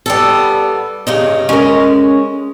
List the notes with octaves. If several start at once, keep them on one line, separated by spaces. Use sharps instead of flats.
G3 B3 A4
G2 C#3 D#4
G#3 C#4 A#4